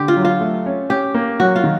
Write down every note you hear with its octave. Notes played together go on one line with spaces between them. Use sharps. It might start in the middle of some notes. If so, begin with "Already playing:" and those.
Already playing: D3 G4
F4
F#3
F4
A3
C#4
C#4 G4
A#3
F#3 F#4
F4
D#3